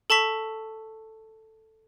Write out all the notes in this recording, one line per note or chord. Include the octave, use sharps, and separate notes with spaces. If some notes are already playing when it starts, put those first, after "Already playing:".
A4 A5 C#6 B6 F7